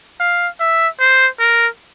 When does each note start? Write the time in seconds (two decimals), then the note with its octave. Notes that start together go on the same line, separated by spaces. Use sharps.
0.20 F5
0.60 E5
1.00 C5
1.40 A#4